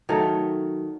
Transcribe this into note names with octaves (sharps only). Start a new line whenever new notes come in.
D#3 F#3 A3